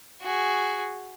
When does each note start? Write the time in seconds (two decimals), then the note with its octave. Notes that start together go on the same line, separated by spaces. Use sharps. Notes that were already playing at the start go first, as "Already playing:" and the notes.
0.22 F#4 G#4